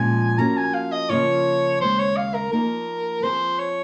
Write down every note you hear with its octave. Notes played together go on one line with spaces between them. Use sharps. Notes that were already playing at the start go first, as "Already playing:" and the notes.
Already playing: A#2 F3 G#3 C#4 G#5
F3 A#3 C#4 F#4 A#5
G#5
F5
D#5
C#3 F3 A#3 F4 C#5
D#2 C#3 G#3 C5
C#5
F5
A#4
F3 A#3 D#4 G#4 A#4
F3 C4 F4 G#4 C5
C#5